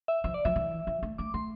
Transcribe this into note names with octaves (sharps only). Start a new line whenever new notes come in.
E5
F3 E5
D5
F3 E5
E3
F3
A3
A3 D6
A3 C6